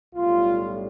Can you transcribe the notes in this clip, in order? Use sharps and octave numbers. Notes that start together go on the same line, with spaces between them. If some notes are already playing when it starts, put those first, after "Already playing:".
B1 A2 G3 F4